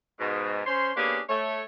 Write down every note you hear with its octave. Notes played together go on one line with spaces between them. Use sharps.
G#2 B2
C#4 C5 C#5 C6
A#3 B3 C#4 D4 G4 G#4
A3 C#5